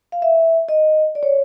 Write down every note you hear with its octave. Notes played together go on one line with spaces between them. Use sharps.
F5
E5
D#5
D5
C#5